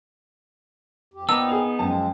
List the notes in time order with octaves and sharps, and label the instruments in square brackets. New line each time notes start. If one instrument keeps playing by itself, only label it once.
[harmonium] F2 G4
[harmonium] A#2 C4 A#4 [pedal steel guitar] B3 D#4 [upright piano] A5 D6 [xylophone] E6
[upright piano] G#4 F7
[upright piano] F#2 A5 [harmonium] F3 G#3 C4